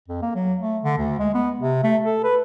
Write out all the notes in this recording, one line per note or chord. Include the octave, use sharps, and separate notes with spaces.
F2
A#3
F#3
A3
D3
D2
G#3
B3
C3
A3
A4
B4